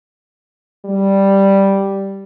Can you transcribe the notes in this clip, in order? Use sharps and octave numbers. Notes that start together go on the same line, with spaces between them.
G3